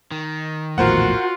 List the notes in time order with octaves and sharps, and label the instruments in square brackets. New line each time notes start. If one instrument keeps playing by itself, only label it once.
[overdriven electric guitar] D#3
[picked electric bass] A#1 E2 A2 [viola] F4 F#4 [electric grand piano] A#4 C5 F#5